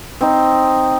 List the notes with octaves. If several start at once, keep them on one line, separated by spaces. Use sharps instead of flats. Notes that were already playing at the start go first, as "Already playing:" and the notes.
C4 D#4